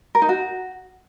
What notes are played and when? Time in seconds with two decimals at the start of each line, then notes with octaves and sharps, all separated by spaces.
0.15 A#4
0.22 D#4
0.29 F#4